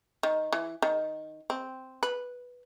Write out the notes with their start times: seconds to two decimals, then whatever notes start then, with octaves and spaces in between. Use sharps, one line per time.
0.23 D#3
0.53 E3
0.82 D#3
1.50 C4
2.03 B4